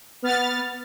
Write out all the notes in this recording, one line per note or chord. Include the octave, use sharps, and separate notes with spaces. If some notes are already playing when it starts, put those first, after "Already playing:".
B3 F6 A6